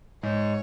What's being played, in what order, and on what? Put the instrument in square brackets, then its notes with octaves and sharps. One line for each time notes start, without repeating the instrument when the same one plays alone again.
[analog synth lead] G#2 [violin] C#5